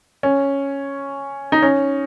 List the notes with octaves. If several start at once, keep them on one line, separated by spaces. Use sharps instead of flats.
C#4
D#4
C#4